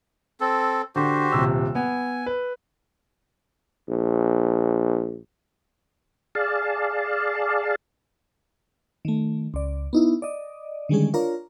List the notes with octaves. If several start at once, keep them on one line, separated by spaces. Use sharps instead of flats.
C4 A4
D3 F#4 G4 C5
D#1 C3 E6
B3 G#5
B4
A#1
G#4 D5 F5 A5
D#3 A3
C#2 D5
B3 D#4 E4
D5 D#5
D3 D#3 G3 G#3 C#4 G#4
D4 F4 A#4 C#5 D5 A#5